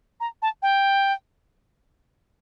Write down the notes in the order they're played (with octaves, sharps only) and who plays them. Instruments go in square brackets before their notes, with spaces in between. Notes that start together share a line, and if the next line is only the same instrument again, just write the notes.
[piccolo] A#5
A5
G5